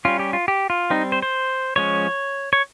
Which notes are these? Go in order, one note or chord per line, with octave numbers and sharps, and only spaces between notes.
G3 C#4 F4
G4
F4
G4
F4
G3 C4 D#4
C5
C5
F3 G#3 C#4 C#5
C#5